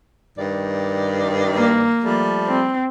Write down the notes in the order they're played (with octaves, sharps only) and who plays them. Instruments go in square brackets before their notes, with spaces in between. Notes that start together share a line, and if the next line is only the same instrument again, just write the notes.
[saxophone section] G2 D#3 D5
[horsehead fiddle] A#3
[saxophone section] F3 G3 A3
[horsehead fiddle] C4